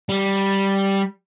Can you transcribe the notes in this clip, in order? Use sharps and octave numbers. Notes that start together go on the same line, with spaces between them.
G3